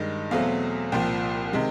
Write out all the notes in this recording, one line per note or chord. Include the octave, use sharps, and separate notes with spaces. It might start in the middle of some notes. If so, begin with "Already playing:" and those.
Already playing: G2 D#3 G#3
E2 B2 F#3 A3 C4 F5
C2 A#2 F3 G5
C3 D#3 G#3